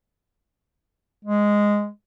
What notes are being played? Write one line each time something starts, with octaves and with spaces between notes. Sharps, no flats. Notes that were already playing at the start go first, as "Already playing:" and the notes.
G#3